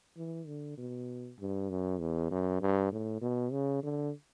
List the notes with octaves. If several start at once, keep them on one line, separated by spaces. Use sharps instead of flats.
E3
D3
B2
G2
F#2
E2
F#2
G2
A2
B2
C#3
D3